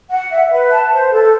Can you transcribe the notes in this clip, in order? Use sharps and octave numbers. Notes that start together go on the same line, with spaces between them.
F#5
E5
B4
A5
C5
A4